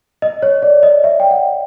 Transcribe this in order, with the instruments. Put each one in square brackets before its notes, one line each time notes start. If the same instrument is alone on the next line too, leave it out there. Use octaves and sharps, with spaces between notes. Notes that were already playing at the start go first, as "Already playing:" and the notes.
[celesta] D#5
C#5
D5
D#5
E5
G5
F#5